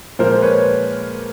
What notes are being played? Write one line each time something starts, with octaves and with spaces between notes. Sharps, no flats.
A#2 F3 G#3 A#4 C5
B4 C#5